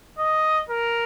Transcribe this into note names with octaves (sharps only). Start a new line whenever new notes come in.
D#5
A#4